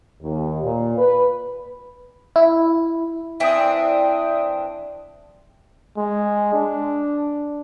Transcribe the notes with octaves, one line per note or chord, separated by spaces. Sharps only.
D#2
A#2
B4
E4
E3 C4 D4 E5 G5 D#6
G#3
D4